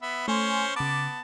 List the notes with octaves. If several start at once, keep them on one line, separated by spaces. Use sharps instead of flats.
B3 E5
A3 C#4 C5 G#5 C6
C#3 B3 A5 D6